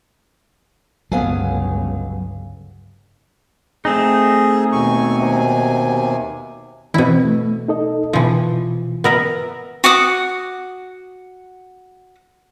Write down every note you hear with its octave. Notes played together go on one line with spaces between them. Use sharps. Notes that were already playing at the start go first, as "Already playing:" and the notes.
G1 C#2 F#3 B3 F5 G#5
A3 C4 D#4 G#4
D#2 B2 G#5 C#6
D#2 C3
B2 E3 C4 E4
A3
D#4 A4 D#5
B2 E3 F3
B3 A#4 E5
F#4 F#5 D6 D#6